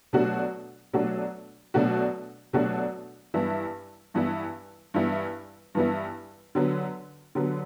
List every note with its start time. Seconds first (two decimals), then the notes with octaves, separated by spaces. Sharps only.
0.13 B2 F#3 A3 D4 F#4
0.93 B2 F#3 A3 D4 F#4
1.74 B2 F#3 A3 D4 F#4
2.53 B2 F#3 A3 D4 F#4
3.34 G2 E3 B3 E4
4.14 G2 E3 B3 E4
4.94 G2 E3 B3 E4
5.75 G2 E3 B3 E4
6.55 D3 F#3 B3
7.35 D3 F#3 B3